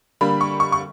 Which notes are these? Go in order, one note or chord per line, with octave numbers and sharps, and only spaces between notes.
D3 G3 A#3 B5
C#6
C#6
C#6